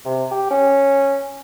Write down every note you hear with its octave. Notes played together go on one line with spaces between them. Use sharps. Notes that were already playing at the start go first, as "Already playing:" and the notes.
C3
G4
C#4